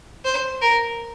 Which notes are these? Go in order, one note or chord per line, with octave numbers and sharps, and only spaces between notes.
C5
A#4